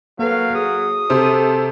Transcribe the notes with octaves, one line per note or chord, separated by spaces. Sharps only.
F#3 A#3 A4 B4 F5
G#4 D#6
C3 C4 A4